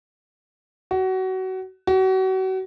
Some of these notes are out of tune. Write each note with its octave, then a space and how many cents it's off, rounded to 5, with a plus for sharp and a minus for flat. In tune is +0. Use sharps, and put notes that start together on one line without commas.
F#4 +25
F#4 +35